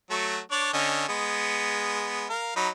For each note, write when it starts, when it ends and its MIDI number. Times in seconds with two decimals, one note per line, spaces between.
0.10 0.39 54
0.10 0.39 57
0.10 0.39 66
0.51 0.72 62
0.51 0.72 73
0.51 0.72 74
0.73 1.05 50
0.73 1.05 61
0.73 1.05 75
1.09 2.29 56
1.09 2.29 59
2.30 2.54 70
2.30 2.54 77
2.56 2.69 54
2.56 2.69 63
2.56 2.69 83